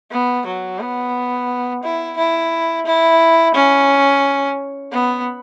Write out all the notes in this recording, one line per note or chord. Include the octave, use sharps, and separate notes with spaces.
B3
F#3
B3
E4
E4
E4
C#4
B3